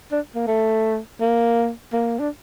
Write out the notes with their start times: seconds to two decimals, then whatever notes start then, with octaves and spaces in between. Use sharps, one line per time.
0.12 D4
0.35 A#3
0.47 A3
1.20 A#3
1.93 A#3
2.19 D4